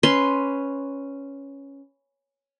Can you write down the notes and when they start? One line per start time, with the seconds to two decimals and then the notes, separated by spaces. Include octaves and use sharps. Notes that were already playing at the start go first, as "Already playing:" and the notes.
0.03 C#4 B4 C6